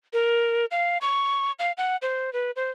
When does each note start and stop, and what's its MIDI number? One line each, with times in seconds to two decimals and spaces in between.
0.13 0.66 70
0.71 0.98 77
1.01 1.52 85
1.59 1.72 77
1.78 1.97 78
2.02 2.33 72
2.33 2.51 71
2.56 2.71 72